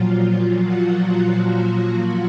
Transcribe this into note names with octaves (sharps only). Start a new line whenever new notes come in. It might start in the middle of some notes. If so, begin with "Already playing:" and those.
Already playing: A#2 F3 F#3 F4
F#3 F#4